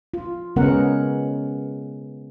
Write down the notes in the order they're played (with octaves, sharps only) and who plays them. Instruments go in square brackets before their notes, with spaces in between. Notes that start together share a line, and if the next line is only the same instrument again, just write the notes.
[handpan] F4
C#3 G#3 B3 C#4 A#4 F#5